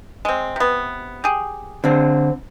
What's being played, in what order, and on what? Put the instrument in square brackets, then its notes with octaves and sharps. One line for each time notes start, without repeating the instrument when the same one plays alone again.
[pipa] G#3 C4
C3 B3
G4 G#4
[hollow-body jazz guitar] D3 C4